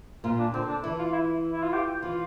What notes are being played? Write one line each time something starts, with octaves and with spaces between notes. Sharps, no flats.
A#2 F4
D4
D3 C4
D4
E3 E4
F4
E4
E4
F4
G4
E3 F4